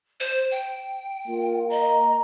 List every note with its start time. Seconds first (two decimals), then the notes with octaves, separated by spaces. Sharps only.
0.20 C5
0.51 G5
1.28 A#3 F4
1.70 D#5 A#5